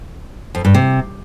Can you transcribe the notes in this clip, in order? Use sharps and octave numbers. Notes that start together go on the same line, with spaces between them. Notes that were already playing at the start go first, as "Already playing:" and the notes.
F2
G2
C3